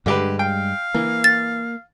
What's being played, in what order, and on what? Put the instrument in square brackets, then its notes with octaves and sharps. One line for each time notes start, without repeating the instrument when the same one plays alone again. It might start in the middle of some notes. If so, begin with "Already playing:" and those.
[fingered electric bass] G2 G3 G#3 [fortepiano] D3 G4 B4
[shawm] F5 [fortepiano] G5
[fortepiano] E3 [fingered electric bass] A#3
[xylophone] A6